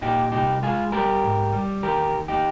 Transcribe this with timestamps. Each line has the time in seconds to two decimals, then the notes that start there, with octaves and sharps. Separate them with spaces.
0.01 A#2 D#4 G4
0.32 C2 D#4 G4
0.63 G#3 F4 G#4
0.92 G3 G4 A#4
1.23 G#2
1.53 G3
1.83 D#3 G4 A#4
2.13 D#2
2.28 D#4 G4